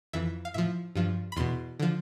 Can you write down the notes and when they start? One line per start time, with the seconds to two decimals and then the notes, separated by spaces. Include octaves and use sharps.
0.13 F2 E3 E5
0.45 F5
0.54 A2 F3 E5
0.95 G2 F3
1.32 B5
1.36 E2 B2 C6
1.79 D3 F3